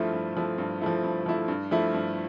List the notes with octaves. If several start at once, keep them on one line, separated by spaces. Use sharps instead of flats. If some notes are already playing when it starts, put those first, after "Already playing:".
Already playing: G2 F3 A3 E4
G2
F3 A3 E4
G2
F3 A3 E4
G2
F3 A3 E4
G2
F3 A3 E4
G2